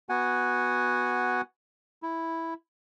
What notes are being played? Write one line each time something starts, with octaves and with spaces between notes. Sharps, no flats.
B3 F#4 F#5 G#5
E4